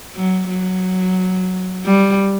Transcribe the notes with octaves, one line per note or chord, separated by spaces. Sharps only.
F#3
F#3
G3